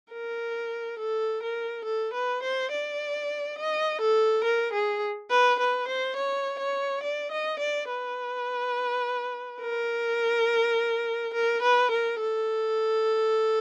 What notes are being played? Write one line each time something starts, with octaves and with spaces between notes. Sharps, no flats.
A#4
A4
A#4
A4
B4
C5
D5
D#5
A4
A#4
G#4
B4
B4
C5
C#5
C#5
D5
D#5
D5
B4
A#4
A#4
B4
A#4
A4